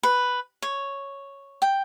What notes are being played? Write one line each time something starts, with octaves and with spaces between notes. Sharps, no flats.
B4
C#5
G5